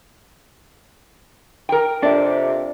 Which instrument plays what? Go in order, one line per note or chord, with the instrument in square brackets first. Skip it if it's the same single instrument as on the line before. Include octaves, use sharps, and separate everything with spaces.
[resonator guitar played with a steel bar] A#4 G5
[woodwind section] F2 C3 [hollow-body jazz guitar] D4